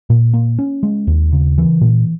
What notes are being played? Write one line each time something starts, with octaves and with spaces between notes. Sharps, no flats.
A#2
A#3
C#4
G#3
D#2
C#3
E3
A#2